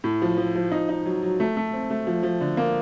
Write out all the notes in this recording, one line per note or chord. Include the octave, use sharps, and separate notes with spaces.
A2
F3
F3
F3
D#4
D#4
F#3
F#3
A3
A3
C4
A3
F3
F3
D3
A#3